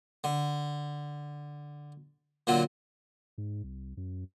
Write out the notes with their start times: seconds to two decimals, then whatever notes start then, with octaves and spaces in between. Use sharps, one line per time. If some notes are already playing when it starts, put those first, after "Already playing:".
0.24 D3
2.47 A#2 D3 F#3
3.38 G#2
3.64 C2
3.97 F#2